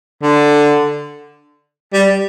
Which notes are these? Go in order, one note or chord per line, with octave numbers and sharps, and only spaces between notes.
D3
G3